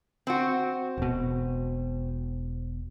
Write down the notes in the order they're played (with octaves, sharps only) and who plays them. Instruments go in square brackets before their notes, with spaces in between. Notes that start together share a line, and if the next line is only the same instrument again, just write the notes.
[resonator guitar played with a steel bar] C4 F#4
[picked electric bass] E1 B2